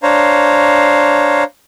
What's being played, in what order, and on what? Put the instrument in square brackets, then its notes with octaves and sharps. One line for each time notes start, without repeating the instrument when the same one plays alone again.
[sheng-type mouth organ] D4 C5 C#5 F5 A#5